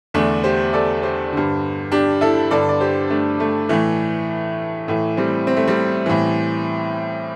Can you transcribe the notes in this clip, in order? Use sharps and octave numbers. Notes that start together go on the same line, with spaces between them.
E2 D3 A3 D4
G4 C5
A4 D5
G4 C5
G2 D3
D4 G4
E4 A4
G2 D3 A4 D5
D5
G4 C5
A3 D4
A3
A2 E3 A3
A2 E3 A3
G3 C4
C4
A3
G3 C4
A2 E3